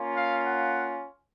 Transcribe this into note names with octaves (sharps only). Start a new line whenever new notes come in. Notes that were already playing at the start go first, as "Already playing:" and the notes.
Already playing: A#3 C#4 F4
F5
F#5